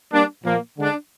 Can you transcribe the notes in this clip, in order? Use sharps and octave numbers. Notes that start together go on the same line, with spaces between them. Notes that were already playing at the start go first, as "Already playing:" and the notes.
G3 A#3 D4
A#2 F3 A#3
D3 G#3 D4